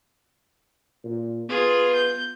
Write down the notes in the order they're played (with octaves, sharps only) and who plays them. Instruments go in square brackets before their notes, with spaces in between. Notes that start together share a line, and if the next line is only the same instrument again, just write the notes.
[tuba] A#2
[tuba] B3 [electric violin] F4 G#4
[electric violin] G6